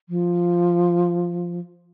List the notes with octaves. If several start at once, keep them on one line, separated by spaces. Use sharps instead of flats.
F3